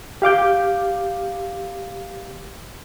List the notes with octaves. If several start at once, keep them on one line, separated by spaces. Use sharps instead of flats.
G4 F5 D6 G6